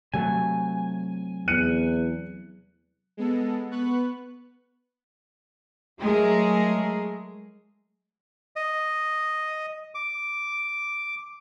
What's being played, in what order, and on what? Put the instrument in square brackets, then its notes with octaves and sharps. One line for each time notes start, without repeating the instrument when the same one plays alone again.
[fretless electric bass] C3 F#3 A3 [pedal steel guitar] G#5
[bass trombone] E2 [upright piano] F#6 C#7 D#7
[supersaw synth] G#3 B3 A4
B3 B4 C#6 F#6
[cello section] F#3 G#3 A3 G#4 A#4
[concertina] D#5
D6